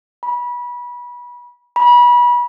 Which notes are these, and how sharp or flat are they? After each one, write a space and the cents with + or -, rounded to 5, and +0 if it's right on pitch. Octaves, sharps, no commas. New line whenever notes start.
B5 -25
B5 -30